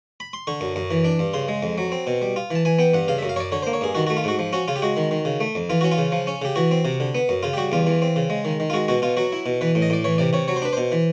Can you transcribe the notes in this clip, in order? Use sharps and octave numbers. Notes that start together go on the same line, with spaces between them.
B5
C6
D3 C#6
F#2
F#2
E3
D4
G2
C#3 C6
G#3
F2
F#3
C4
B2
G3
F4
E3 A5
E3 G#5
B3 G5
G2 F#5
C#3 F5
E5
F#2
F5
F#2 C#5 D5
D3 C#5
C5
A#3
C#5
G2 G#4
D#3 F#4
F#4
A3
F4
G#2 F#4
F3
C#4 F#4
C#3 F4
G4
G#3 F#4
D#3
D#3
C#3
A3
F2
E3 F4
C#4 F#4
F4
C#3
F3
C#4
C#3 G4
E3 F#4
C4
C3
D3
B3
F#2
C#3 F4
G4
G3 F#4
E2 F4
E3
C4
C#3
G#3
D#3
D#3
F4
G#3 F#4
B2 F#4
B2 F4
F#3 F#4
E4
B2
E3 B4
A2
D#5
A2 D5
E3 C#5
C3 D5
C3 C#5
F#3 C#5
C5
D4 B4
B2 C5
E3